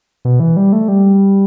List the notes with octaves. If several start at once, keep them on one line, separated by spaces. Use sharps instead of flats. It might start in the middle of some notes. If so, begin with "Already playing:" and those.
B2
E3
G3
A3
G3